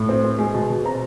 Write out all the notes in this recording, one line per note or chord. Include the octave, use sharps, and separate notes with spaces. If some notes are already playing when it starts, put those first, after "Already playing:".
Already playing: A2
C4
C4
G#3
B2
B2
C4 A#5